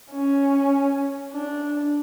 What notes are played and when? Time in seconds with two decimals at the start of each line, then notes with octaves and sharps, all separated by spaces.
0.11 C#4
1.33 D4